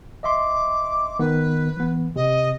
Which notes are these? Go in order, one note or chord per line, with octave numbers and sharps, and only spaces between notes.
D#5 E5 C6 D6
D#3 B3 B4
E3 B3
C3 D#5